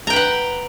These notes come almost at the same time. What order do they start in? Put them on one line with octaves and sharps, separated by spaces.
A#5 G5 B4 F#5